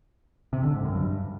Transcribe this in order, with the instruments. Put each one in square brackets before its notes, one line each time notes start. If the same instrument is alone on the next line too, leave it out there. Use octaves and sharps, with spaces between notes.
[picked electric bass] C3
D3
G#2
F#2
G2